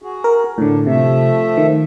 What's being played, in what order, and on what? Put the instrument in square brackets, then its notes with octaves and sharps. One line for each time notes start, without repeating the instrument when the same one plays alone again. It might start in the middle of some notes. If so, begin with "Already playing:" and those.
[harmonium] F#4 G#4
[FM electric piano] A#4
[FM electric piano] A2 D3 [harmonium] D4
[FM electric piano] C3 [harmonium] F3 A3 E5
[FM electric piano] D#3